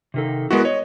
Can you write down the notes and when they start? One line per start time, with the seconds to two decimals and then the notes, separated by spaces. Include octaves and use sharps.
0.14 C3 D#3 A4
0.51 G#3 B3 E4 F#4 A#4
0.65 C#5 D#5